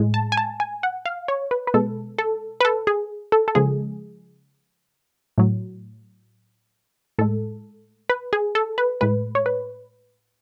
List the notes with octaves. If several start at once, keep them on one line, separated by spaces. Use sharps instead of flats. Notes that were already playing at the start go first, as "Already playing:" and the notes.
Already playing: A2 G#3
A5
G#5
A5
G#5
F#5
F5
C#5
B4
B4
B2 G#3 A4
A4
B4
A4
G#4
A4
A4
C#3 F3 G#3 G#4
A2 F#3
A2 G#3 A4
B4
G#4
A4
B4
A2 G#3 B4
C#5
B4